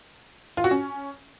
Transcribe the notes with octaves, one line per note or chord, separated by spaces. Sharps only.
F4
F#4
C#4